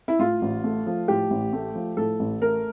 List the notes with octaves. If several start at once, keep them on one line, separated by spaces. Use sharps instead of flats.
E4
A2 F4
A1
A3
F3
A2 G4
A1
A3
F3
A2 A4
A1
A3 A#4